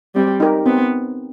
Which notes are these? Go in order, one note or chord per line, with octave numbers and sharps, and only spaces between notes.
G3 C4
D#4 G4 A#4
B3 C4